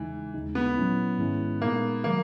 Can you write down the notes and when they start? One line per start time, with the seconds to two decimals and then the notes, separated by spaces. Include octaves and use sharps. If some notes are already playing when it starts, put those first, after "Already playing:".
Already playing: E2 C#3 E3 G#3 D#4
0.34 D#2 C#3 G#3 D#4
0.55 B3
0.77 A#2 F#3 C#4 E4
1.18 G#2 D#3 G#3 C#4 E4
1.61 A#2 G#3 A#3 B3 D#4
2.04 D#3 F#3 A#3